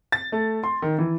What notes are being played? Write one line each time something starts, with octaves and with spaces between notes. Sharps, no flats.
A6
A3
C6
D#3
E3